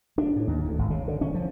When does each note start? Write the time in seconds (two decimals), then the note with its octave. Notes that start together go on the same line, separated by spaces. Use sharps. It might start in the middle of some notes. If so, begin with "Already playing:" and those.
0.18 D4
0.36 A2
0.47 D#2
0.64 D2
0.79 G#1
0.90 C#3
1.08 D3
1.21 C#4
1.34 F3